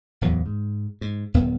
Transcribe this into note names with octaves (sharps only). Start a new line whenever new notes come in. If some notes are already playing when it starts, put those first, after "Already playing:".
D1 E2 F#3
G#2
G#2
D#1 F#2 B3